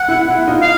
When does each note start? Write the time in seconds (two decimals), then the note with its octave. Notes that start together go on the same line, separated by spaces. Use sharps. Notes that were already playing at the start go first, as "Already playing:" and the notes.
Already playing: F#5
0.08 E4
0.28 E4
0.47 D#4 F4
0.62 F5